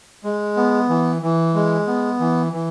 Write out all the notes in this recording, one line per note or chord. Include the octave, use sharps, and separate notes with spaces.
G#3
B3
E3
E3
G#3
B3
E3
E3